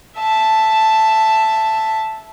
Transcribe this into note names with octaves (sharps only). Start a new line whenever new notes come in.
E5 A5